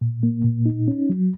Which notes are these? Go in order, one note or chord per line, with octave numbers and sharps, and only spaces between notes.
A#2
A#3
A#2
D#4
C#4
F#3